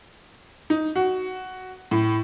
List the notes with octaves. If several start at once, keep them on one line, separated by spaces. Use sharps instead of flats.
D#4
F#4
A2